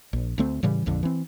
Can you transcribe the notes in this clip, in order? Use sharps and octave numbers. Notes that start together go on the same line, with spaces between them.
A#1
D2 A3 C4
A2 C#3 E3 G3
A#1 F2 D3
E3 C4